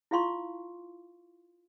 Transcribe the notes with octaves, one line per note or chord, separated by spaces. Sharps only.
E4 F4 F5 C6 C#6